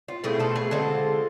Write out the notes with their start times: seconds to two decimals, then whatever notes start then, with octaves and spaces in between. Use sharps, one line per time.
0.08 F4
0.24 B2 A3 C4 E4 G#4
0.39 F4 A4
0.56 G#4 B4
0.71 D3 G#3 C4 F4 A4